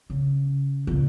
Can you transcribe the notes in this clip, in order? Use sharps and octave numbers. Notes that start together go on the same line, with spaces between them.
C#3
C#2 A#2